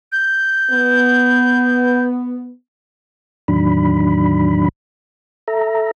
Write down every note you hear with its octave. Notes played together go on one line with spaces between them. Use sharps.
G6
B3
E2 A2 D#3 F#3 D4 B5
A4 E5 A#5